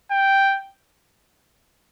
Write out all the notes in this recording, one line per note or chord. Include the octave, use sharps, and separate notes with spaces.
G5